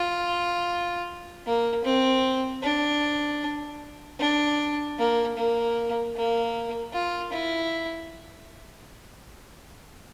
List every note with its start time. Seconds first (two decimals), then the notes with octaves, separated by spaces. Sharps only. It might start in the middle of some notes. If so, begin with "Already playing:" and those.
Already playing: F4
1.46 A#3
1.84 C4
2.63 D4
4.19 D4
4.98 A#3
5.37 A#3
6.16 A#3
6.93 F4
7.32 E4